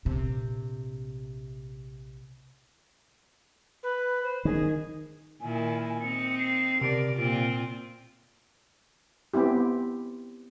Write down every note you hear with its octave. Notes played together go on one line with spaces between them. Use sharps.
A#1 C3
B4
C5
D#3 G#4
A#2 D#3 E4 G#5
C4 D#4 C#7
C7
C3 A#4 D5 D7
A#2 C4 F4
B3 C4 E4 G4